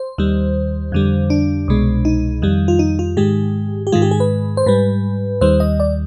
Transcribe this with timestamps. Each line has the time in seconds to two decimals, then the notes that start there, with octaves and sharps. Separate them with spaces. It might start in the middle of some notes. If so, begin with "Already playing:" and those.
Already playing: C5
0.18 D#2 D#3 G3
0.92 F2 D3 G3
1.30 D4
1.68 C2 B2 G#3
2.05 D#4
2.42 F2 D#3 G3
2.68 F4
2.79 D#4
2.99 F4
3.17 G#2 D#3 G#3 G4
3.87 G4
3.92 G#2 D#3 G#3 F4
4.02 G4
4.11 G#4
4.20 B4
4.57 C5
4.66 G#2 G3 B4
5.41 D#2 D#3 G3 C5
5.60 D#5
5.80 D5